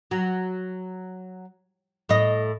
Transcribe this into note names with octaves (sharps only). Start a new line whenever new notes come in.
F#3
A2 D#5